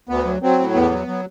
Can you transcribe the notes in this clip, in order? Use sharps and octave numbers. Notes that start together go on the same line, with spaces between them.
D2 B3
F#3
F#3 C4
A2
E2 B3
F#3
F#3